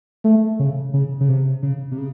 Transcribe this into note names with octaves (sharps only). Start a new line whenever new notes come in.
A3
C#3
C#3
C#3
C3
C#3
C3
C#3